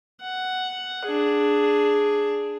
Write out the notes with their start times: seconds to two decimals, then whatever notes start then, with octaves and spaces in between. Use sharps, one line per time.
0.21 F#5
1.05 D4 G#4